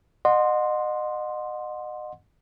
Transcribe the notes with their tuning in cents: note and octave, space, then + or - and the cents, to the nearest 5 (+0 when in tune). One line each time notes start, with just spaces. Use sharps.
D#5 -30 F#5 -25 C6 +0